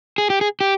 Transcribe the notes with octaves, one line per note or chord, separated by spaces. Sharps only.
G#4
G4
G#4
G4